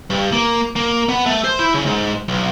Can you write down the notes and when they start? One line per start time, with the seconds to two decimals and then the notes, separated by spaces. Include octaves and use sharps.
0.10 G2
0.32 A#3
0.76 A#3
1.09 B3
1.26 A3
1.44 C5
1.59 E4
1.74 C#3
1.86 G#2
2.28 B1